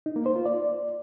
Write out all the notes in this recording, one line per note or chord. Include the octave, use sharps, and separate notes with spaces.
D#4
A#3
C5
F4
D5